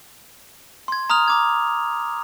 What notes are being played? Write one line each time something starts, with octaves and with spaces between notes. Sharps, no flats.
C6 G#6
A#5 D#6 F6 F7
A#5 D6 G#6